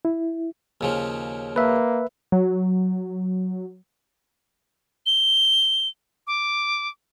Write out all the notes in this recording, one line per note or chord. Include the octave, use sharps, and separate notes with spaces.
E4
D#2 C#3 F3
A#3 B4 E5
F#3
G7
D6